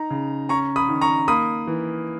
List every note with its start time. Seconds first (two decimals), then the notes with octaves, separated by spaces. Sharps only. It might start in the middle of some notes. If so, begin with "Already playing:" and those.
Already playing: D#4 A#5
0.10 C#3
0.49 C#4 A#5 C#6
0.76 B5 D#6
0.89 D#3
1.01 A#5 C#6
1.28 A#3 B5 D#6
1.67 E3